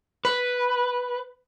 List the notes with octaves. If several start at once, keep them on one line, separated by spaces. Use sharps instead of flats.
B4